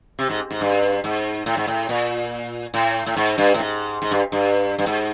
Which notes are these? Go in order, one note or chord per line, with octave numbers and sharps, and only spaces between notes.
C3
G#2
G#2
G2
G#2
A2
G#2
A2
A#2
A2
A2
G#2
G2
A2
G#2
G#2
G2
G2
G2
G#2